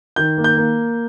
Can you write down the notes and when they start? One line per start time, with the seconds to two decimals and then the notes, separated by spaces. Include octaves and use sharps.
0.16 D#3 G6
0.38 A#3
0.44 G6
0.57 A#3